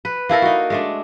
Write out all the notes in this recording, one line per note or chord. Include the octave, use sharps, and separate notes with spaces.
B4
A#3 E4 A4 A#4
D#4 F#4
G#3 A3 D4